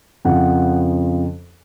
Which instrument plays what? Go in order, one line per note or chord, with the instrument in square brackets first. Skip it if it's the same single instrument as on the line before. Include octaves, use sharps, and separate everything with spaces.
[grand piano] F2 C#3 F3 F#5